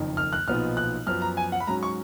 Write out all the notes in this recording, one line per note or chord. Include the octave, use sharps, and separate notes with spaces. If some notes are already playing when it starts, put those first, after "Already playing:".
Already playing: F#1 F2 D#3
F6
F#6
B1 A#2 F3 B3 D#4 F6
F#6
F#2 F3 B3 F6
A#5
G#5
F#5
B5
G#2 F#3 C#4 A#5
C#6